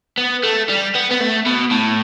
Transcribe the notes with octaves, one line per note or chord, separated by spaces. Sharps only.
B3
A3
G3
B3
B3
A3
B2
A2